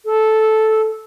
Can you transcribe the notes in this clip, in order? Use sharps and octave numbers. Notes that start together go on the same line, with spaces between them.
A4